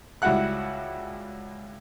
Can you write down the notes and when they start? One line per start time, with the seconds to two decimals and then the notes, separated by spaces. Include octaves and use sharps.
0.22 C#2 G3 E4 F#4 F#5 F#6